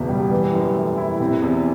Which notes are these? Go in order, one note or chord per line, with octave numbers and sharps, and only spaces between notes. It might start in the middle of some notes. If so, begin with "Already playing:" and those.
Already playing: F#1 E2 B2
G3
E3
F#2
A3
E4
C3
E2